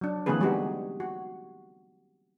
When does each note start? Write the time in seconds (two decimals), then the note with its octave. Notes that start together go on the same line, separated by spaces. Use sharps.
0.01 F#3 D4
0.26 D3 E3 A#3 C4 G#4 B4
0.41 G3 G#3 B3 D#4 F#4 G4
1.00 F#4